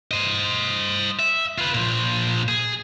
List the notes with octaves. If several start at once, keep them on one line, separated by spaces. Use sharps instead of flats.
C5 D#5
E5
F4 B4
A#2 F3
G#4